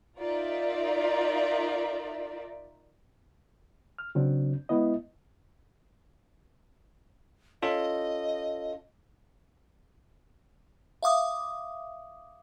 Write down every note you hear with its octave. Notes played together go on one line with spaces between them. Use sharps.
D#4 F4 A#4 D5 E5
F6
C#3 F#3 C4 D4
G#3 B3 E4 D#5
C#4 F4 A4 D#5
E5 F5 D6 D#6